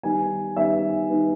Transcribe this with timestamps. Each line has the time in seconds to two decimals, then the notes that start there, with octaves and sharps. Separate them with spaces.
0.03 D#3 G3 B3 D#4 G#5
0.56 D#3 G3 B3 D#4 E5
1.09 D#3 G3 B3 D#4